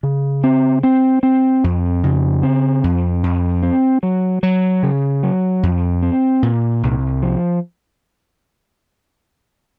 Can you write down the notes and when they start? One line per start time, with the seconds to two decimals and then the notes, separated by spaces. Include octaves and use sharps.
0.03 C#3
0.44 C4
0.83 C4
1.23 C4
1.64 F2
2.04 C#3
2.43 C4
2.84 F2
3.23 F2
3.62 C4
4.03 F#3
4.43 F#3
4.83 C#3
5.23 F#3
5.63 F2
6.02 C4
6.42 A#2
6.83 C2
7.22 F3